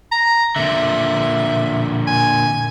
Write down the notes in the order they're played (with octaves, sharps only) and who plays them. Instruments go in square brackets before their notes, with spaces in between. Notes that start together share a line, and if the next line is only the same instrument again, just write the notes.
[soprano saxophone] A#5
[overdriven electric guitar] A#2 D3 [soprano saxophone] E5
[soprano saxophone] G#5